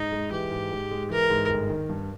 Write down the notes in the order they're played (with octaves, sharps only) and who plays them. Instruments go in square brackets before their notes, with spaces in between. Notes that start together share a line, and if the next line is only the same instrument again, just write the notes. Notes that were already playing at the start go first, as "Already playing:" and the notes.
Already playing: [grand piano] G#2 [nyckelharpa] D#4
[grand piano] G#3
[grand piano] E3 [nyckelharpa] G4
[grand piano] G#2
G#2
G#3
[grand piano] E3 [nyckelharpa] A#4
[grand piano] G#2
G1
D#3
G2